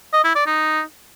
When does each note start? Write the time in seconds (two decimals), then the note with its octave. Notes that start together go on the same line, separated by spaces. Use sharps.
0.13 D#5
0.24 E4
0.35 D5
0.46 D#4